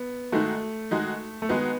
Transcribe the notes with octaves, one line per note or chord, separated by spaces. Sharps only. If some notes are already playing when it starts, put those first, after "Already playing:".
Already playing: B3
D#3 G#3 A3 D#4 F#4
D#3 G#3 D#4 F#4
A3
D#3 G#3 B3 D#4 F#4